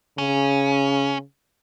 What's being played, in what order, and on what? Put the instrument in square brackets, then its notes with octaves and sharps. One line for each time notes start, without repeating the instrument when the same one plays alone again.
[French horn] C#3 [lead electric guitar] C#4